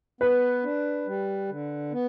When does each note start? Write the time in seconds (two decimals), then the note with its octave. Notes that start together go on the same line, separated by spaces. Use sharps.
0.21 B3 B4
0.63 D4
1.07 G3
1.49 D3
1.92 B3